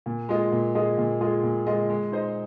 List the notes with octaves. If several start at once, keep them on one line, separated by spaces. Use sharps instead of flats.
A#2
G#3 F4 G#4 D#5
A#2
G#3 F4 G#4 D#5
A#2
G#3 F4 G#4 D#5
A#2
G#3 F4 G#4 D#5
G#3
D#4 C5 D#5